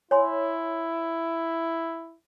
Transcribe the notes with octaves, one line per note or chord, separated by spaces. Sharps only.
E4 C#5 G#5 C6